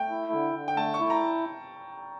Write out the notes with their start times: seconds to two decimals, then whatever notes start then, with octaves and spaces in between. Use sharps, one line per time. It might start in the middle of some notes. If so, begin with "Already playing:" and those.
Already playing: A3 G5
0.10 E4
0.32 D3
0.55 D3
0.68 G5
0.77 A3 A5
0.94 C#6
1.00 E4
1.10 A#5